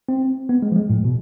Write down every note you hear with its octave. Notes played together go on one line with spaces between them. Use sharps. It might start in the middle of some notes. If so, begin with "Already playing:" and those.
C4
B3
G#3
F3
G#3
A2
B2